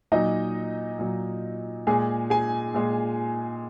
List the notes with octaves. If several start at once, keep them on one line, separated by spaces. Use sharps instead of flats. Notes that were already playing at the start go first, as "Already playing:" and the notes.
A#2 F#3 D#4 D#5
A#2 F#3
A#2 G#3 G#4 G#5
G#4 G#5
A#2 G#3